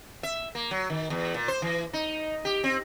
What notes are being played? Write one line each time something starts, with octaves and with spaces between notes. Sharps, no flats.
E5
A#3
F#3
D#3
E2
A#2
C5
E3
D#4
G4
C4